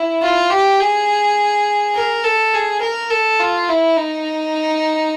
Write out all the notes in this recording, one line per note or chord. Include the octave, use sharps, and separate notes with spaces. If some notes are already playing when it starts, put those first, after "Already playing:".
Already playing: E4
F4
G4
G#4
A#4
A4
G#4
A#4
A4
F4
E4
D#4